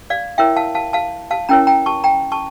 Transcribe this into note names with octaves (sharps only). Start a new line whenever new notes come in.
D5 F5
E4 A#4 C#5 E5 G5
F5 A5
F5 A5
F5 A5
F5 A5
C#4 E4 A#4 C#5 G5 A#5
G5 A#5
A5 C#6
G5 A#5
A5 C#6